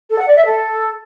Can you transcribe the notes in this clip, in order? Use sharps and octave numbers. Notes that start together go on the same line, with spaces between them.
A4
F#5
D5
E5
A4